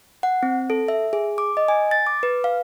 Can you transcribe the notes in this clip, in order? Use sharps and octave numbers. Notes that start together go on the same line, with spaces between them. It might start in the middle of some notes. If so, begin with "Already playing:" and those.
F#5
C4
A4
E5
G#4
D6
D#5
G#5
A6
D6
B4
F5